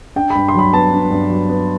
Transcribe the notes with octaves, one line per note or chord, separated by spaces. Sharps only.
D4 G5
G2 B5
C6
F#3 B5
B3 A5
D4
G2
F#3
B3